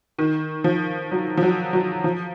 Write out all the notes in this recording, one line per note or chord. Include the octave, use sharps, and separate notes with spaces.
D#3
F3
F#3
F3
F#3
F#3
F3